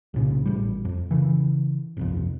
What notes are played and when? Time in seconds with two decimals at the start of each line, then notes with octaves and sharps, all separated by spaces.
0.14 C2 A#2 C#3
0.46 A1 G3
0.85 F2
1.11 C#3 E3
1.97 G1 C2 F2